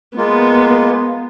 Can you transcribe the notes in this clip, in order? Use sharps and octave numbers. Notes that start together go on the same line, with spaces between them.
G#3 A#3 B3 F4